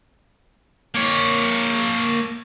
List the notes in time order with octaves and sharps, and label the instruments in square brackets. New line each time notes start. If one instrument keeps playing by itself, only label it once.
[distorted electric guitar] A#3 C#5